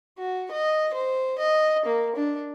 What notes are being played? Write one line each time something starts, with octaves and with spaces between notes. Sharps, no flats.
F#4
D#5
C5
D#5
A#3
D4